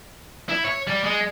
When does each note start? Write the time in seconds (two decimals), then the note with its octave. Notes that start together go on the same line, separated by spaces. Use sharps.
0.49 E4
0.64 C#5
0.87 G3
1.04 G#3